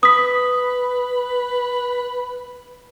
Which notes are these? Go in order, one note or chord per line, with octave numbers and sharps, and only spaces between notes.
B4 D#6 B6